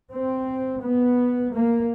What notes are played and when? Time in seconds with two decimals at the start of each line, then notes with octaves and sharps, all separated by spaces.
0.12 C4
0.83 B3
1.53 A#3